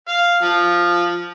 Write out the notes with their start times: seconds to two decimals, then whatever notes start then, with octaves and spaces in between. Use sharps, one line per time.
0.08 F5
0.42 F3